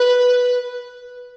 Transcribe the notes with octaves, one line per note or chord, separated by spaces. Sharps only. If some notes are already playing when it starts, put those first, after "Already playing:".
Already playing: B4